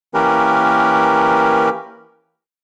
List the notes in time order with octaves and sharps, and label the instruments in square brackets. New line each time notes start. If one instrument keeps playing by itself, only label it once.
[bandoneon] E3 A#3 C#4 G4 A#4 B4